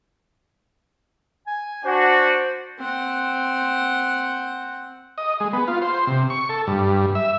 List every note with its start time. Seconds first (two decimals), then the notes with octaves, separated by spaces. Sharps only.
1.47 G#5
1.85 D4 F#4 C5
2.78 C4 F#5
5.18 D#5
5.40 G#3
5.53 B3
5.68 F4
5.82 C5
6.07 C3
6.30 C#6
6.49 A4
6.67 G2
7.15 E5